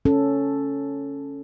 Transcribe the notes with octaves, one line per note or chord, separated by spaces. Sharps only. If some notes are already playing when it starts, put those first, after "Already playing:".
C#4 A4